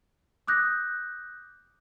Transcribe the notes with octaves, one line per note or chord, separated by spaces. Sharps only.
D6 D#6 F#6 G6 A#6